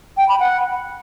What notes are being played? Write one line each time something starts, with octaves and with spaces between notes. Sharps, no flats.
G5
B5
F#5